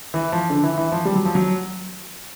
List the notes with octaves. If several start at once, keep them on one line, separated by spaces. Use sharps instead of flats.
E3
F3
D3
E3
E3
F3
G3
F#3
F3
F#3